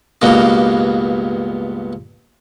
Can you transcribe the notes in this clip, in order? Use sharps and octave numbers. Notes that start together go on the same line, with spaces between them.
C#2 G2 B2 A#3